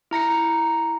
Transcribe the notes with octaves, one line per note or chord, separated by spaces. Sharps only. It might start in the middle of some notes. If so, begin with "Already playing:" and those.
E4 A#5 A#6 C#7